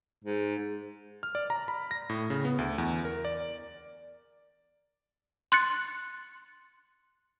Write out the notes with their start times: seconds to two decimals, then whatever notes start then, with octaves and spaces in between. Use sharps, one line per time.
0.24 G#2
1.23 F6
1.35 D5
1.50 A#5
1.68 B5
1.91 A#6
2.09 A2
2.30 C#3
2.45 B3
2.58 D2
2.78 E2
3.05 A#4
3.25 D5
5.52 C6 F#6 A6 C#7